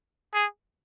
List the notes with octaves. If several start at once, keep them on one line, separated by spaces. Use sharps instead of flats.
G#4